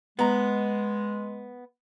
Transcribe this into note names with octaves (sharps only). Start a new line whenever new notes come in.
G#3 B3 A#5